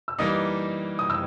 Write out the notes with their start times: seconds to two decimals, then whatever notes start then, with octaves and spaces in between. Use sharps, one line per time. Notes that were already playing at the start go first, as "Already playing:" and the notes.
0.08 E6
0.19 E3 G3 A#3 D#4 D#5 D#6
0.99 D#6
1.10 E6